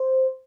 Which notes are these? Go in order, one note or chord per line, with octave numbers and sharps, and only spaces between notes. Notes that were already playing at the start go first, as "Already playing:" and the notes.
Already playing: C5